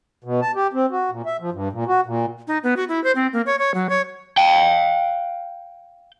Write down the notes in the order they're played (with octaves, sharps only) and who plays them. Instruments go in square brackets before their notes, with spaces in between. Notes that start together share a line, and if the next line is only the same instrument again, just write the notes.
[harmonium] B2
A5
G4
C4
F#4
A#2
E5
F3
G2
A#2
F#4
A#2
[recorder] D#4
B3
F#4
E4
C5
C4
A#3
C#5
C#5
F#3
C#5
[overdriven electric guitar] F5 G5